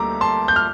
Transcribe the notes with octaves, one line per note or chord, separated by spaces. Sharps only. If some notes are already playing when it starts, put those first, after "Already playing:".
Already playing: D2 D3 G3 A#3 A#5 D6
A5 C6
G6
F6